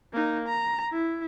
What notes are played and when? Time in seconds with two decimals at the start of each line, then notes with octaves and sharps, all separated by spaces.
0.13 A#3 D#4
0.48 A#5
0.92 E4